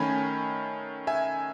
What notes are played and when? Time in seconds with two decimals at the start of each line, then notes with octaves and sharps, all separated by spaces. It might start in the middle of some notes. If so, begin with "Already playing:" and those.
Already playing: D#3 A3 C#4 G#5 B5
1.07 E5 G#5